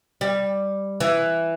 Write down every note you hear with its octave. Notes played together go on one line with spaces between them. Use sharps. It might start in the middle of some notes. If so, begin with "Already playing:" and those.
G3
E3